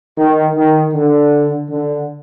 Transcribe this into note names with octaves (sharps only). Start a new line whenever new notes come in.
D#3
D#3
D3
D3